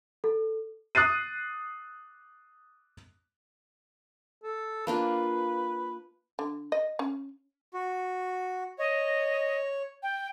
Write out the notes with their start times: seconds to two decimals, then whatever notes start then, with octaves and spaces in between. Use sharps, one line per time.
0.24 A4
0.95 D#6 F#6 A6 C7 D#7
4.44 A4
4.87 A#3 D4 F4 B4
6.39 D3
6.72 D#5
6.99 C#4
7.74 F#4
8.79 C#5 D#5
10.03 G5